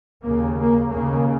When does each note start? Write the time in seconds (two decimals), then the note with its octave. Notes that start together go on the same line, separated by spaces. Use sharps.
0.24 D#2 C#3 A#3
0.58 A#3
0.91 D#2 C#3 A#3